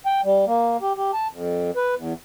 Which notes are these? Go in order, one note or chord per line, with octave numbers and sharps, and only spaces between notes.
G5
G3
A#3
G4
G4
A5
F2
B4
E2